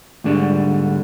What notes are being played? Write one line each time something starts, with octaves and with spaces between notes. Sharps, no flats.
D2 G#2 D3 G3